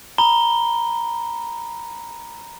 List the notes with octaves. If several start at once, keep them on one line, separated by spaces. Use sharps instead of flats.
A#5 B5 G7